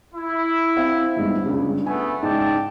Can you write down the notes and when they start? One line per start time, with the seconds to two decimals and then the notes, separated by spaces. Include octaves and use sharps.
0.14 E4
0.76 C4 E5 F5
1.16 G1 G#2 G3
1.46 C#2 G2 C#3
1.86 A3 B3 G#5
2.23 G#2 C#3 D5 G5 A5